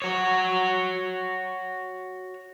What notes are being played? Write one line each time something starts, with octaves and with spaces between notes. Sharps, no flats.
F#4 C#5